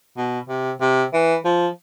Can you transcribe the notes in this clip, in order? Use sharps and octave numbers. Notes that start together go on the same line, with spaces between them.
B2
C3
C3
E3
F3